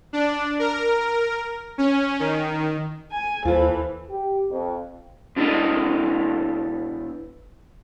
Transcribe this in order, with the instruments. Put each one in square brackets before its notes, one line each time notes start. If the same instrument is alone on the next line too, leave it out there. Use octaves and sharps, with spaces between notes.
[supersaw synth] D4
A#4
C#4
D#3
[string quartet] G#5
[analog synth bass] D#2 [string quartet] E3 [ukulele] F4 A4 [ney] C5
[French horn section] G4
F2
[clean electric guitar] B2 D4 E4 G4 A4 D#5